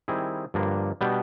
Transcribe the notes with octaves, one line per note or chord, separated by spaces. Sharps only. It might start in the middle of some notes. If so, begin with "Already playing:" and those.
D#3 G3 C4 E4 G#4
G2 D3 F3 A#3 D4
B2 G3 B3 D4 G4